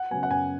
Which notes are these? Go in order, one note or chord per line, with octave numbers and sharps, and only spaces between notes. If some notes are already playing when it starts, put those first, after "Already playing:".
Already playing: F#5
C#3 F#3 B3 G#5
F#5
F#2 G#5